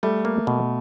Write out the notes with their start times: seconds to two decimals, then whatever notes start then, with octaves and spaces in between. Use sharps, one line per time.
0.03 G3 A3
0.25 A#3
0.47 B2